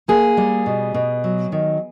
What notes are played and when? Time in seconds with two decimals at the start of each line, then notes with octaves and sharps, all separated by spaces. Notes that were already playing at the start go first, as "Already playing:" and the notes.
0.08 A#3 G#4
0.37 G3
0.66 B2
0.94 B2
1.24 F#3
1.52 D#3